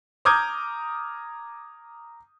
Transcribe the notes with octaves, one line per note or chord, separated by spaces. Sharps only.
A#5 D6 D#6 F6 G6 G#6